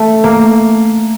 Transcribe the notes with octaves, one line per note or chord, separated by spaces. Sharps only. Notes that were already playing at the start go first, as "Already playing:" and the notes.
Already playing: A3
A#3